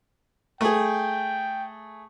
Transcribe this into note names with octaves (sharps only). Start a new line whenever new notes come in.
A3 G#4 G5